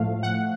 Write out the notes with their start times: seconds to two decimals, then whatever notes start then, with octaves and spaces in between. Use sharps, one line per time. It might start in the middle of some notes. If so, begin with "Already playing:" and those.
Already playing: A2 F3 A3 F5
0.23 F#5